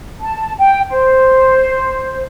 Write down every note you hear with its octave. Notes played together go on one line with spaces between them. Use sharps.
A5
G5
C5